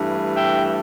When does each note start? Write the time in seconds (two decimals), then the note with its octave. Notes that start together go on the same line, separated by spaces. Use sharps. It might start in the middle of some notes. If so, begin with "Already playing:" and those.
Already playing: G2 E3 A3
0.36 E5 G5